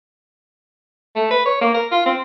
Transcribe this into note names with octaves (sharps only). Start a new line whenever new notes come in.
A3
B4
C#5
A#3
A#4
F4
C4